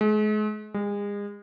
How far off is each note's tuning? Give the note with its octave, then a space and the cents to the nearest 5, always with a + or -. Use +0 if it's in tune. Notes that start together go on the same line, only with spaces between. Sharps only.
G#3 +40
G#3 -35